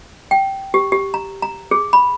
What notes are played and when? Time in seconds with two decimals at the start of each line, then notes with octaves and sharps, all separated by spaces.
0.31 G5
0.74 G4
0.92 G4
1.14 A#5
1.42 A#5
1.71 G#4
1.93 B5